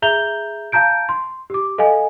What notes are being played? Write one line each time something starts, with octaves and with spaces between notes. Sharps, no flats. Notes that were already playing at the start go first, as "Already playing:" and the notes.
G#4 E5 A#5 G6 F7 G7
F5 A5 A#5 G6 D7
C6
G4 D6
A4 D#5 F5 G#5